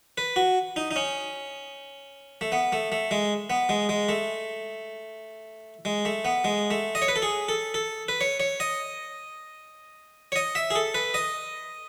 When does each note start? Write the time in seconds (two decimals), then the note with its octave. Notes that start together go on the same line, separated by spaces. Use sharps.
0.18 B4
0.36 F#4
0.76 D#4
0.91 D#4
0.96 C#4
2.41 A3
2.52 B3
2.72 A3
2.92 A3
3.11 G#3
3.50 B3
3.69 G#3
3.89 G#3
4.09 A3
5.85 G#3
6.05 A3
6.25 B3
6.44 G#3
6.71 A3
6.95 D#5
7.02 C#5
7.08 B4
7.16 A4
7.22 G#4
7.49 A4
7.74 A4
8.08 B4
8.21 C#5
8.40 C#5
8.60 D#5
10.32 C#5
10.36 D#5
10.55 E5
10.71 G#4
10.75 A4
10.94 B4
11.14 D#5